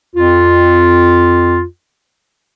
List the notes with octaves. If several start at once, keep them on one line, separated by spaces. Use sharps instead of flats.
F2 F4